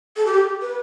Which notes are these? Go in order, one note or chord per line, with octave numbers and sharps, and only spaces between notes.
A4
G4
B4